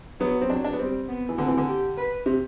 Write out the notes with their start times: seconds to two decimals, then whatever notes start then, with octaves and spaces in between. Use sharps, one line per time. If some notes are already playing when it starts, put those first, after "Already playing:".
0.20 F#3 B3
0.41 C4
0.50 F#3 D4
0.64 D4
0.73 B3
0.79 G3 C4
1.08 B3
1.29 E3
1.38 D3 C4
1.48 E3
1.58 D3
1.68 G4
1.97 B4
2.26 C3